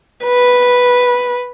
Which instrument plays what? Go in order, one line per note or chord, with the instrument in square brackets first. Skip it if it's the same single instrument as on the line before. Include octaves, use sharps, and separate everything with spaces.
[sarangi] B4